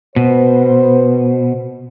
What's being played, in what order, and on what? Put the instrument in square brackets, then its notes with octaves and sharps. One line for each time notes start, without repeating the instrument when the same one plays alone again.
[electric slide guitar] B2 [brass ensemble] B4 C5